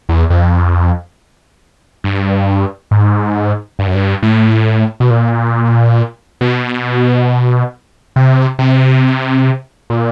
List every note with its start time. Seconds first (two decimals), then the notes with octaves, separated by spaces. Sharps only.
0.09 E2
0.30 F2
2.04 G2
2.91 G#2
3.79 G2
3.87 F#2
3.95 G2
4.23 A2
5.00 B2
5.10 A#2
6.41 B2
8.16 C3
8.59 C3
9.90 A#2